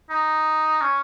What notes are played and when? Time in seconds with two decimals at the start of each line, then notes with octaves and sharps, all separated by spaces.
0.10 D#4
0.82 C#4